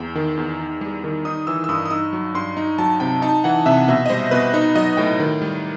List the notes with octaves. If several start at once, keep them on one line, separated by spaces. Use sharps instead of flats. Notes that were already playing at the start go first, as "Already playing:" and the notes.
Already playing: E2 G5
D#3
E2
D#4
G3
D#3
D#4 D#6
E3 E6
E6
G2 D#6
D#6
D#4 E6
F#3
G2 C6
D#4
F#3 A5
C3 G5
D#4 A5
E3 F#5
C3 E5
B2 E5
D#5
G3 C5
B2 B4
D#4 B4
F#3 D#5
A2 G5
D#3
G3